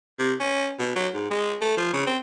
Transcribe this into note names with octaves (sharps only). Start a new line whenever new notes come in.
C3
C#4
B2
F#3
G#2
G#3
A3
F3
C#3
C4